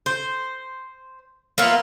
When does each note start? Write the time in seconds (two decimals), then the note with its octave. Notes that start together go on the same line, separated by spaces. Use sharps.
0.06 C5
1.58 A#3 B3 E4 F4